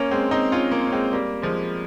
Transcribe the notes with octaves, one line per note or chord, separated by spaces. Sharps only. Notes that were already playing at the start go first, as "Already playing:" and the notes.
Already playing: A#3 C#4
G#3 C4
C4 D#4
C#4 F4
A#3 C#4
C#4
G#3 C4
G3 A#3
F3 G#3